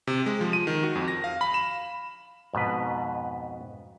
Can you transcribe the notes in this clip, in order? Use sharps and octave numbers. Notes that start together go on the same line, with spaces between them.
C3
G#3
F3
D#7
D#3
F#4
F2
A#6
F5
B5
E7
F2 G#2 B2 B4